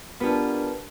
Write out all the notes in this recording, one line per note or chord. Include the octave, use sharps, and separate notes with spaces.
B3 D4 F4 G4 A#4 B4